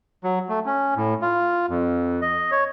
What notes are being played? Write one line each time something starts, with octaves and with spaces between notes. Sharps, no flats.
F#3
A3
C#4
A2
F4
F2
D#5
C#5